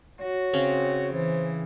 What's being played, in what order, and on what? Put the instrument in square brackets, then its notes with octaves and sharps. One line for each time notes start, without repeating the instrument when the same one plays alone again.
[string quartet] F#4 [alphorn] C#5
[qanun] C#3 C4 C#4
[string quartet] E3 [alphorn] C5